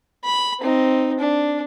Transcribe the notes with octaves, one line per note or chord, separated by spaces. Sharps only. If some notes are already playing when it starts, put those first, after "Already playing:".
B5
C4 D#4
D4